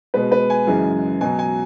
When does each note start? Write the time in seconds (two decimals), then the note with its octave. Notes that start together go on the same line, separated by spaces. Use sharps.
0.14 B2 G#3 B4
0.32 B4
0.50 G#5
0.67 F#2 C#3 E3 G#3
1.21 B2 F#3 G#5
1.39 G#5